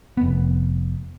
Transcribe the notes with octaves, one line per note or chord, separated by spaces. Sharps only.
F1 B3